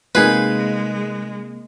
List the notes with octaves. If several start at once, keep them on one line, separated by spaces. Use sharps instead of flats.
C3 G#3 A#3 D#4 G#4 B4 F5